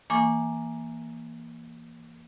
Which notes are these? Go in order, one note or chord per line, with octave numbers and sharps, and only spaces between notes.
E3 A#3 G#5 C#6 D6